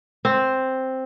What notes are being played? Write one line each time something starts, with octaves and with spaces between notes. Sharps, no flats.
C4